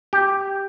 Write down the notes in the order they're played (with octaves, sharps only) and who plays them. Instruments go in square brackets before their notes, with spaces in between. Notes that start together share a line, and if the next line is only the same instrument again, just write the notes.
[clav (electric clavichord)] G4